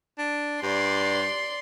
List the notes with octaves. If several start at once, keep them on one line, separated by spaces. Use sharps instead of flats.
D4
G2 D5 C6